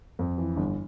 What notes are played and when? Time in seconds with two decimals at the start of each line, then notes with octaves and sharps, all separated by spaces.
0.19 F2
0.38 E3
0.57 G1